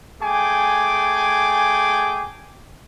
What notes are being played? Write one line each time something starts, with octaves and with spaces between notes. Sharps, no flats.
A3 G#4 G5 G#5 D6